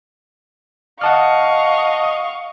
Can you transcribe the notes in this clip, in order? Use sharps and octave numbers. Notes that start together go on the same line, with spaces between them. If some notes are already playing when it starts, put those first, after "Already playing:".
D#5 F5 F#5 A5 C#6 F6